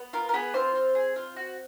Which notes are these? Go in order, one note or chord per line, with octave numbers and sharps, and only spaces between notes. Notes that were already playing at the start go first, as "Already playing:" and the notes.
Already playing: B3
F4 A#4
A#4
B3 G#4 B4
C4 F4 C5
F4
G#4
F4
F#4